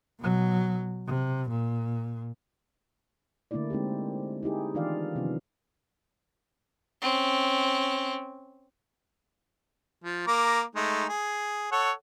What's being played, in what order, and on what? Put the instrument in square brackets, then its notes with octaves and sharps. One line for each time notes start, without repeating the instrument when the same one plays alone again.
[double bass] B2 F#3
C3
A#2
[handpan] D3 A3 A#3 D4 E4 D5
G#3 C4 D#4 G4
D#4 E4 G4 G#4
D#3 E3 D4 F4 D5 F5
C3 D#3 F3 F#3 B3 C#4
[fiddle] C4 C#4
[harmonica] F3
A#3 A#5 D6
G#3 A3 D#4
G#4
A4 C#5 F#5